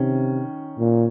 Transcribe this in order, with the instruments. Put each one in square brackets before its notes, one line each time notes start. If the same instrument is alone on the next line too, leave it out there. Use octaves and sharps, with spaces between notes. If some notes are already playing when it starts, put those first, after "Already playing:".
Already playing: [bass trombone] C3 [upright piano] D#3 C#4
[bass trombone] A#2